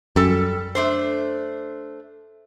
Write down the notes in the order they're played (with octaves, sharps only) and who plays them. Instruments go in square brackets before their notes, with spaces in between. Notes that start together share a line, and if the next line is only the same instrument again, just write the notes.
[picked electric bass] F#2 [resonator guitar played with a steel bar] G3 A4
[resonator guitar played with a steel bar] A3 D4 C5